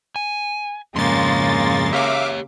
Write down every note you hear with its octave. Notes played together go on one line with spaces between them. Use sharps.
G#5
F2 G#2 C#3 G#3 A#3 C6 A6
G4 C#5 E5 F5 D6